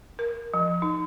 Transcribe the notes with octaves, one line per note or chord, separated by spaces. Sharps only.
A#4
F3
D#4